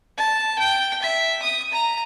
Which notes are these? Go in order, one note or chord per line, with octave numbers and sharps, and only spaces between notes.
A5
G5
E5
D#6
A#5